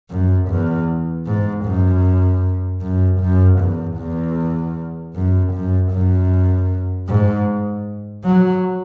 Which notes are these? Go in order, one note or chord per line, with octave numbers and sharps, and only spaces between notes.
F#2
E2
G#2
F#2
F#2
F#2
E2
E2
F#2
F#2
F#2
G#2
F#3